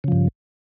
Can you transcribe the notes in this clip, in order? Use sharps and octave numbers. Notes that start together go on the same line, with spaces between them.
G2 C#3 F3